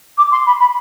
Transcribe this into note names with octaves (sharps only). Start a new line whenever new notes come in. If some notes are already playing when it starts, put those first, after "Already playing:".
D6
C6
B5
B5